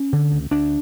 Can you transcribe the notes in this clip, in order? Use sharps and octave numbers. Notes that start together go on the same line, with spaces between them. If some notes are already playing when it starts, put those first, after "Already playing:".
Already playing: C#4
D3
D2
D2 D4